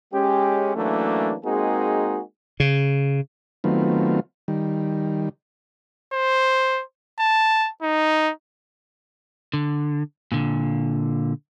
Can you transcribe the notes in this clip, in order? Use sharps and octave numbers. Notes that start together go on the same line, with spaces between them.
G#3 C#4 G4
E3 F#3 A3 A#3 C#4 D4
G#3 A#3 C4 D#4 F#4 G#4
C#3
D#3 F#3 A3 B3 C4 F4
D#3 G3
C5
A5
D#4
D3
A#2 D3